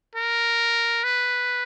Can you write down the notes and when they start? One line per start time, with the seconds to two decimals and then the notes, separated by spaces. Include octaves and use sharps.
0.15 A#4
1.04 B4